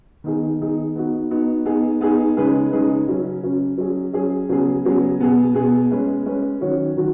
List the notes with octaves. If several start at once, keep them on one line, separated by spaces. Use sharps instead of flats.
D#3 B3 D#4 G#4
D#3 B3 D#4 G#4
B3 D#4 F#4
B3 D#4 F#4
B3 D#4 G#4
B3 D#4 G#4
C#3 G#3 D#4 G#4 B4
C#3 G#3 D#4 G#4 B4
C#3 F#3 C#4
C#3 F#3 C#4
F#3 C#4 G#4
F#3 C#4 G#4
C#3 F#3 B3 G#4
C#3 F#3 B3 G#4
B2 B3 G#4
B2 B3 G#4
G#3 C#4 B4
G#3 C#4 B4
D#3 F#3 C#4 F#4 C#5
D#3 F#3 F#4